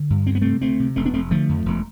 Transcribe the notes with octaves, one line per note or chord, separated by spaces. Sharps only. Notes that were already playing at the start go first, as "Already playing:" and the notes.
Already playing: D3
G2
D2 C4
B3
C3 A3 C4
D2 A3 C4
C3
F1 A3 C4
B3 D4
F1 A3 C4
D3 F3 A3
F2
E1